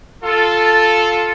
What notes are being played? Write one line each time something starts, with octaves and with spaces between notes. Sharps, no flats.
F4 A4